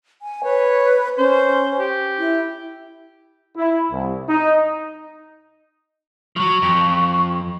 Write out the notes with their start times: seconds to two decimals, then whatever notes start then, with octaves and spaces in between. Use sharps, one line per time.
0.22 G#5
0.44 B4 C#5
1.18 C#4 C5
1.79 G4
2.19 E4
3.57 E4
3.92 C2
4.29 D#4
6.36 F3 F#3 C#6
6.62 F2